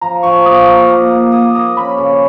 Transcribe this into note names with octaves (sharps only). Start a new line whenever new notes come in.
F3 A#5
F3 C#6
A#3 D#6
A#4
A#3
A#3
A#3 D#6
A#4 D#6
C#4 B5
C#3